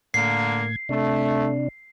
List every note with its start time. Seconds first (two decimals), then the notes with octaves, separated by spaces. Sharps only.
0.14 A2 D3 A#3 G#6 C7
0.89 C3 A3 D4